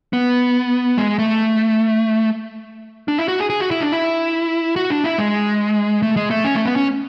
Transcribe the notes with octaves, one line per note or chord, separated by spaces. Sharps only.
B3
G#3
A3
D4
E4
F#4
G#4
G#4
F#4
E4
D4
E4
F#4
D4
E4
G#3
A3
G#3
A3
C#4
A3
B3
C#4